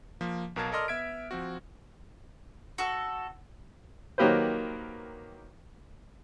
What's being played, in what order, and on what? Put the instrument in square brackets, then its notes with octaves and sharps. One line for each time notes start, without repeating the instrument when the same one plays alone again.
[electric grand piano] F3 A#3
B1 B2 A#4 F5 A5 G#6
A4 A#4 D5 D#5 C6 F6
B3 E5 G#6 B6 D7
F3 C4 F#4
[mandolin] F#4 A4
[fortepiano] D#3 F#3 A#3 G4 B4 C5